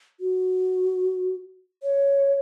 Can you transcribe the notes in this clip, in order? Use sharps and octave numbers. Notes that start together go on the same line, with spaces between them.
F#4
C#5